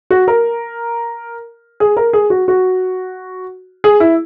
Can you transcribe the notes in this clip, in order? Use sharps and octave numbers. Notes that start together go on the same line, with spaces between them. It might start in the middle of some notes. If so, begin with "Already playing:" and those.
F#4
A#4
G#4
A#4
G#4
F#4
F#4
G#4
E4